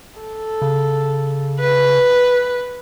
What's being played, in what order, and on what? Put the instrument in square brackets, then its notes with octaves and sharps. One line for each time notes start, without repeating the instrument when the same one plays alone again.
[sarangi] A4
[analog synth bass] C#3
[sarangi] B4